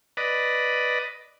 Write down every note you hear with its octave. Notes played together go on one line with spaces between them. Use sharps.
B4 D5 D#5